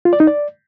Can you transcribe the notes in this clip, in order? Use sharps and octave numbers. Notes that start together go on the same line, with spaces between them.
F4
D5
D#4
D5